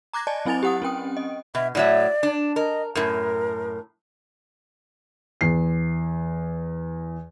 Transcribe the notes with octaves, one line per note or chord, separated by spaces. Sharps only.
A#5 D6 F#6 G#6 A#6
D5 D#5 G#5 A5
F#3 C4 E4 G#5 A6 F7
G4 F#5 D#6
C4 C#4 G5 D#6
D#5
B2 E5
A2 F#3 D5 E5
D4
A#4 D#5
F#2 A2 A#4
E2 C7